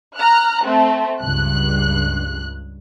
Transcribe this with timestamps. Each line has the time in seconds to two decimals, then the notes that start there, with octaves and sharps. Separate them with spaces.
0.17 A#5 F6 F#6
0.63 A3 C4
1.22 C#2 G2 F#6